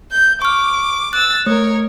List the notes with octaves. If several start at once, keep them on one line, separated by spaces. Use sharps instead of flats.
G6
C#6 D6 F6
E6 F#6 A6
A3 A#4 C#5